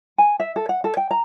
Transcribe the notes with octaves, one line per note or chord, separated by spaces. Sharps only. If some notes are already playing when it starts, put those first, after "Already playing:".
G#5
E5
A4
F#5
A4
G5
A#5